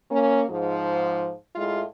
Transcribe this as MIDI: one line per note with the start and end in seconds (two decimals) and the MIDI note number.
0.11 0.44 58
0.11 0.44 61
0.50 1.32 44
0.50 1.32 53
1.55 1.83 45
1.55 1.83 56
1.55 1.83 64
1.55 1.83 65